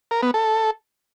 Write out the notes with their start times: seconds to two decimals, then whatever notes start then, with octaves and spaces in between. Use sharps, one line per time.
0.11 A#4
0.23 B3
0.34 A4